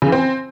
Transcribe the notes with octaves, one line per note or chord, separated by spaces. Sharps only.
C#3
E3
C4